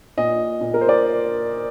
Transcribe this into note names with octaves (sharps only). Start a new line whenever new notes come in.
A#2 D#5
A#2
A#4
C5
D5